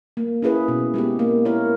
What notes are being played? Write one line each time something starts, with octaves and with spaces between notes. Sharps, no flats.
A#3
C#4 E4 G#4 B4
B2
G#3 B3 G4
A#3
E4 A#4 C#5